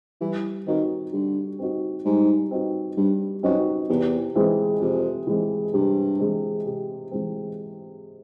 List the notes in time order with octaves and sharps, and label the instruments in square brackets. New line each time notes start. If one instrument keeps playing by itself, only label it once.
[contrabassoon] E3 [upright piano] G3
[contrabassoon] D#3 [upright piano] C4 D#4 F#4
[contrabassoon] D3 [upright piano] G3
[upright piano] C4 D#4 F#4
[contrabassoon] G#2 [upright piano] G3
[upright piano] C4 D#4 F#4
[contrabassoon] G2 [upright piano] G3
[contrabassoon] F#2 [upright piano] C4 D#4 F#4
[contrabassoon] E2 [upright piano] C3
[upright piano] E3 G#3 C4
[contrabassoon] F2 [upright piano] C3
[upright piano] E3 G#3 C4
[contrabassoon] G2 [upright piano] C3
[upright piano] E3 G#3 C4
C3
E3 G#3 C4